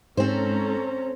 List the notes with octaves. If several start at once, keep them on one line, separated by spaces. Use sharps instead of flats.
G#2 C4 C#4 A4 C5 A#5